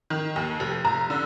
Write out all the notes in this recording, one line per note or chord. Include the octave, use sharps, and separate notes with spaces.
D#3
D#2
F1
F1 A#5
D3